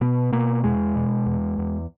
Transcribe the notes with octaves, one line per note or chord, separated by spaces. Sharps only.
B2 B3
B2 A#3
E2 G#3
B2
E2
E2